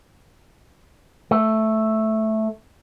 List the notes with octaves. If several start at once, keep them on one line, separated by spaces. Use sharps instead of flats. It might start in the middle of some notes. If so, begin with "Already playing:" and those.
A3